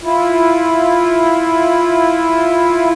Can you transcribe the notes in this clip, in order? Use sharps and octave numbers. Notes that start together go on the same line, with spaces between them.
E4 F4